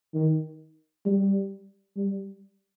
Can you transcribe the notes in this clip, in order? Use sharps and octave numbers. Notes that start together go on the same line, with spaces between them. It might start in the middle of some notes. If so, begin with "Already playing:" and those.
D#3
G3
G3